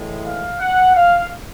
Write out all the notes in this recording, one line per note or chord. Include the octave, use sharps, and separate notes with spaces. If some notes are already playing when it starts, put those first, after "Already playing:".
Already playing: A2 E3 G#3
F5
F#5
F5